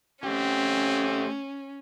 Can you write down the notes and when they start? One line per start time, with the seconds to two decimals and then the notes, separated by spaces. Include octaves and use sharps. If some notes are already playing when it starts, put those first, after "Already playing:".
0.23 A3 C4 C#4 G4